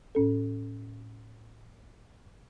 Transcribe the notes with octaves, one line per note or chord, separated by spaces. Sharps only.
A2 C#4 A4